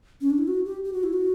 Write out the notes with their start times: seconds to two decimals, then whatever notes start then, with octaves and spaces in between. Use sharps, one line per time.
0.21 C#4
0.30 D4
0.38 E4
0.48 F#4
0.66 G4
0.84 G4
0.93 F#4
1.03 E4
1.13 F#4